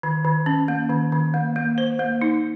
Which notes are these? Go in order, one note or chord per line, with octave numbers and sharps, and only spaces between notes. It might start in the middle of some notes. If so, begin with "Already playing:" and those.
D#3
D#3
C#4
A#3
D#3
D#3
A#3
A#3
C5
A#3
D#4